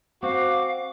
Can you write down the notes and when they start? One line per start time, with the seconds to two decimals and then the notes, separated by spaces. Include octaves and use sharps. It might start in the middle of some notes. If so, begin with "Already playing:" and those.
0.23 C4 F#4 F5 D6